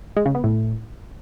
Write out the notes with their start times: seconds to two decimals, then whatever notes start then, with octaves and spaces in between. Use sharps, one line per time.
0.16 G#3
0.26 C#3
0.35 B3
0.44 A2